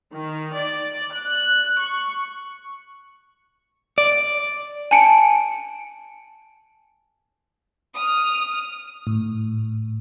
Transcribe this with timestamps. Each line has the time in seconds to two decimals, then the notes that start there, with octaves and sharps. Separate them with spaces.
0.13 D#3
0.54 D5
1.13 F#6
1.80 C#6
3.98 D5
4.91 G#5 A5 C#7 D7
7.95 D#6 F6
9.07 A2